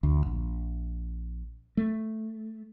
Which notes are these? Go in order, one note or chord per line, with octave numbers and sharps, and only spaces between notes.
D2
A#1
A3